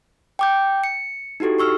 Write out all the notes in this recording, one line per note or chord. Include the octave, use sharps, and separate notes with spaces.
G5 D6 G6
C#7
D#4 E4 F#4 G4 A4
G4 C#6 E6 F6